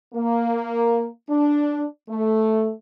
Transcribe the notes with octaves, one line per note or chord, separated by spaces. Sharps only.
A#3
D4
A3